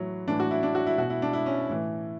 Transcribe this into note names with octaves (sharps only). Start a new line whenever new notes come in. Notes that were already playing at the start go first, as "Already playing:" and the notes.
Already playing: A2 E3 F#3
A2 E3 D4
F#4
E4
D4
F#4
E4
B2 F#4
E4
D4
E4
C#4
A2 E3